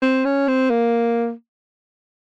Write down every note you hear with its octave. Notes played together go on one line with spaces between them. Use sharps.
C4
C#4
C4
A#3